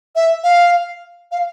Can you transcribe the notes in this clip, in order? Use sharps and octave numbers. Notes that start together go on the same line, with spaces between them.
E5
F5
F5